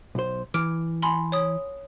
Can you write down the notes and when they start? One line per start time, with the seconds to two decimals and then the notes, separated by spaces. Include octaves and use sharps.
0.15 B1 C5
0.54 E3 D6 F6 D7
1.02 G#5 B5 C6
1.32 C#5 D#6